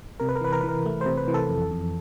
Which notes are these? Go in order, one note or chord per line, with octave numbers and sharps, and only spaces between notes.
C3 A#4
B4
A#4
E3 B4
A#4
E3 B4
A#4
A3
C3 C5
B4
E3
A4
F2
F2